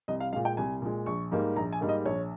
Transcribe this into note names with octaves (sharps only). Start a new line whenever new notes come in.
C2 D#5
F5
A#2 G#3 F5
G5
C2 G#5
A#2 G#3
A#1 C#6
G#2 G3 A#3
A#1 A#5
G#5
G#2 G3 A#3
D#5
A#1 C#5